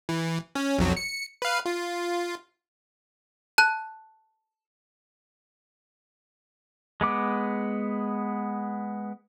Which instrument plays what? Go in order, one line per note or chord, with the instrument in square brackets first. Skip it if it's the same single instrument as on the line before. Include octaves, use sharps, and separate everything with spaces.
[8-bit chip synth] E3
C#4
B1 F2 F#3
C#7
B4 F5
F4
[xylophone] A5 F#6
[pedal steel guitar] G#3 B3 D6